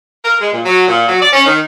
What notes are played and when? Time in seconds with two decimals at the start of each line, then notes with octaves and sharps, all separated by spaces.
0.25 A#4
0.40 G#3
0.52 A#2
0.65 F#3
0.88 A#2
1.08 F#3
1.22 D5
1.33 C#4
1.45 D#3